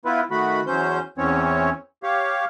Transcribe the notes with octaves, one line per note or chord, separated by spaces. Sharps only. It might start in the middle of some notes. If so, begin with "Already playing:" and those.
B3 E4 F4 B4
D#3 A3 F#4 B5
E2 F#3 C#4 C5 G6
E2 E3 C4 C#4 C#5
G4 C#5 F5